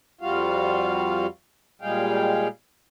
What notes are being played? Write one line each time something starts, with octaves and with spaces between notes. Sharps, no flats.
F2 G3 F4 F#4 F5
A#2 G3 G#3 G#4 F5 G5